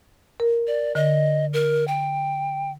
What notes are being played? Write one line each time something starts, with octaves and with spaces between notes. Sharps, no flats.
A#4
D5
D3 D#5
A#4
G5